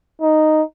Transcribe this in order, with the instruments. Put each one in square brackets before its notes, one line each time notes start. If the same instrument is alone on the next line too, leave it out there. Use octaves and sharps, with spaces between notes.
[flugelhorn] D#4